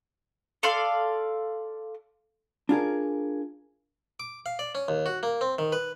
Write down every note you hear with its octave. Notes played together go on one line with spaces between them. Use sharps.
A4 D5 F5 C6
D4 F4 G#4 A#4
D6
F5
D5
C#4
D#2
F#4
A#3
C4
D#3
B4